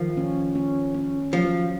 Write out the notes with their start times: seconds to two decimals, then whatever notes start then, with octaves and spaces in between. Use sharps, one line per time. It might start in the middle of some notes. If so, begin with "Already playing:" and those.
Already playing: D#3 F3
0.17 C#4
0.55 C#4
0.95 C#4
1.33 F3 F#3